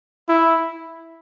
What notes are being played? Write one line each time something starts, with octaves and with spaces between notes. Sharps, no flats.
E4